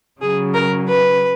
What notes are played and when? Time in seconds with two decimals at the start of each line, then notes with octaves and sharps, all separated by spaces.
0.21 C#3 F#3 G#4
0.54 A#4
0.87 B4